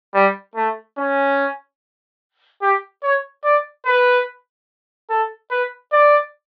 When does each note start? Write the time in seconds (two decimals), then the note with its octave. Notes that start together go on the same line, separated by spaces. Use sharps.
0.14 G3
0.55 A3
0.97 C#4
2.62 G4
3.03 C#5
3.44 D5
3.85 B4
5.10 A4
5.50 B4
5.92 D5